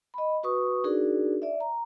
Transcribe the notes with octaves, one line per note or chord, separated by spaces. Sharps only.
D#5 B5
F#4 B4 C#6 D#6
D4 D#4 F#4 G#4 A#4 D5
D5 E5
A#5